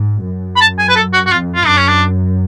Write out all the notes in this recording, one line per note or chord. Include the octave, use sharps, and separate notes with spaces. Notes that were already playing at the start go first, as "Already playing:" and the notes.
Already playing: G#2
F#2
B5
A5
G#5
B4
A4
F#4
F#4
F2 F4
F4
F#2 D4
C#4
D4